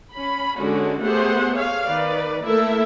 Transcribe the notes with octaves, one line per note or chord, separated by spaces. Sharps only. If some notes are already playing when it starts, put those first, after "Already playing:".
C#4 B5
D3 G#3 C#4 D4 F#4
A3 B3 G4 G#4 C5 F#5
G#4 C#5 F5
D#3 B4 D5
A3 A#3 E4 A4 A#4 E5